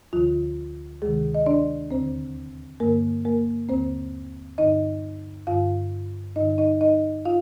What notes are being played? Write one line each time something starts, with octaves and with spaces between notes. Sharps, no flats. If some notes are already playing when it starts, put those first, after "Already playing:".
D2 D3 F3 F4
D2 C3 D#3 G#3 G#4
D#5
D4 D5
D#2 D3 C4 C5
G2 D3 A#3 A#4
A#3 A#4
D#2 D3 C4 C5
G2 D3 D#4 D#5
G2 D3 F4 F5
G2 D3 D#4 D#5
D#4 D#5
D#4 D#5
F4 F5